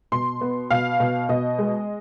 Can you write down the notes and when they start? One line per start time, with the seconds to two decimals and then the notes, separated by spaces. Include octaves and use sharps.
0.12 B2 C6
0.41 B3
0.70 B2 F5
1.00 B2
1.29 B2 D#5
1.58 G#3